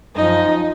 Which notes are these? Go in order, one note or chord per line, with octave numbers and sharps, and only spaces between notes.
F#2 F3 D#4 D#5